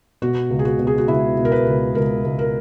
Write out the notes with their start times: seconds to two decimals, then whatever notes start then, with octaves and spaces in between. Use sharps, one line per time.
0.22 B2 F#4
0.50 C#2
0.59 G#4
0.65 F#4
0.79 B2
0.87 G#4
0.98 F#4
1.08 C#2 E4
1.37 B2
1.45 A#4
1.52 B4
1.67 C#2
1.95 C#2 A#4
2.24 C#2
2.39 A#4